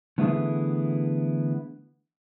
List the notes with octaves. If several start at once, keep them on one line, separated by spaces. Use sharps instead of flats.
D3 E3 A3 B3 E4 G#4